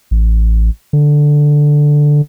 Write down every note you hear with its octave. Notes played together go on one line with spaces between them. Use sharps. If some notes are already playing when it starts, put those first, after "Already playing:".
A1
D3